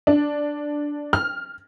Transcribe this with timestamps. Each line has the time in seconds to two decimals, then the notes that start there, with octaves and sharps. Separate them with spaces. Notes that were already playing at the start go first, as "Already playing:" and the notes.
0.07 D4
1.13 F6